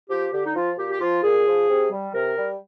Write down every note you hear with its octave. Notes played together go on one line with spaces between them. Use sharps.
F3 G4
D3 G4
D#4
F3 F4
A#2 G4
G4
F3 F4
A#2 G#4
F3
C3
G3
C3 A#4
G3